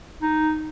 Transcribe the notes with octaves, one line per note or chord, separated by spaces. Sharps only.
D#4